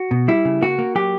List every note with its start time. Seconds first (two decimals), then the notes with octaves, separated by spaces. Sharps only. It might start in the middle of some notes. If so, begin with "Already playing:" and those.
Already playing: F#4
0.11 B2
0.28 G3 E4
0.45 C#3
0.62 A#3 F#4
0.78 A#3
0.95 F#3 G4